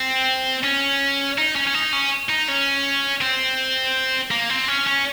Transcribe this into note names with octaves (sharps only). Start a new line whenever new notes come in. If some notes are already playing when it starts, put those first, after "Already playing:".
Already playing: C4
C#4
D#4
C#4
C#4
D#4
C#4
D#4
C#4
C4
A#3
C4
C#4
C#4